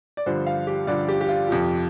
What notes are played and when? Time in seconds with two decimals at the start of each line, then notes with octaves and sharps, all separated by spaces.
0.17 D5
0.26 G2 D3 F3 C5
0.47 F5
0.67 G4
0.87 G2 D3 F3 D5
1.08 G4
1.21 G4
1.28 F4
1.48 F2 C3 F3